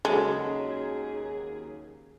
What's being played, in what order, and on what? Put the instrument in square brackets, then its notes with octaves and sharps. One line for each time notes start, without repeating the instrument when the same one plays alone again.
[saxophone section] D#2 G#4 [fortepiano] C#3 F#3 [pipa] G#3 [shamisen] A4